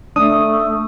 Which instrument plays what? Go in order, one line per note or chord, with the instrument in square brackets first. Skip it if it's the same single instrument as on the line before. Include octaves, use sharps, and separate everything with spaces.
[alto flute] A3 [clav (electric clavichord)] D4 [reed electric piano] D#6